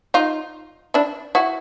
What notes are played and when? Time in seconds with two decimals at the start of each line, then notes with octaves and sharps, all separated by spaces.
0.14 D#4 F4
0.94 D4 E4
1.35 E4 F#4